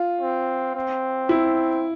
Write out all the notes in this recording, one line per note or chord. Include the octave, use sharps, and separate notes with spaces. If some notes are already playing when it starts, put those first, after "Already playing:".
Already playing: F4
C4
C4
E4